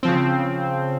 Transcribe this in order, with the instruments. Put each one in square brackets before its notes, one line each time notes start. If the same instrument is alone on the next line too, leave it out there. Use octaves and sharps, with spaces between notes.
[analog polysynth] C#3 F3 C4